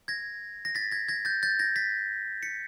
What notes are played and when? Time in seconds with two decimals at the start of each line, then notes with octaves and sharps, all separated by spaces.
0.08 G#6 A#6
0.65 A#6
0.75 A6 B6
0.91 G#6 A#6
1.08 G#6 A#6
1.25 G6 A6
1.43 G6 A6
1.59 G#6 A#6
1.76 A6 B6
2.43 B6 C#7